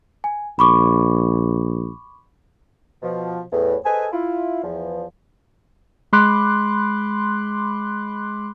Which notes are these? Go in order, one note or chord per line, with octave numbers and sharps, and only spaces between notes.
G#5
A#1 B5 C#6 D6
B2 F3
E2 A2
G#4 A4 B4 C5 D#5 G#5
E4 F4
E2 F3
G#3 B5 C6 D6 F#6